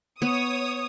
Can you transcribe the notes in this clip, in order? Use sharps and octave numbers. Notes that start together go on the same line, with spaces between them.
B3 C#5 D#6